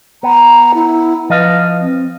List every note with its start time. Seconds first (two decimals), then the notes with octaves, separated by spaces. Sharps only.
0.23 B3 A#5
0.75 E4
1.30 F3 B4 D#5 F5
1.81 C4